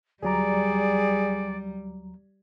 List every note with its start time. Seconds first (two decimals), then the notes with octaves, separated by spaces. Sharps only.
0.23 D2 F#3 G3 G#4 D5 A#5